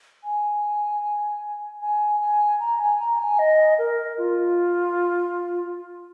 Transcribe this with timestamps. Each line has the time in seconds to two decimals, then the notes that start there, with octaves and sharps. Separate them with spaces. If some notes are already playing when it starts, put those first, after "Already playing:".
0.24 G#5
1.81 G#5
2.20 G#5
2.60 A#5
2.80 G#5
2.99 A#5
3.19 G#5
3.39 D#5
3.79 A#4
4.18 F4